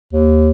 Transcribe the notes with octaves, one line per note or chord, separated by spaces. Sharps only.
D#2